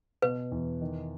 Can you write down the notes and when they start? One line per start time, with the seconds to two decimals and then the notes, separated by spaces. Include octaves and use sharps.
0.22 B2 B4
0.52 E2
0.81 D#3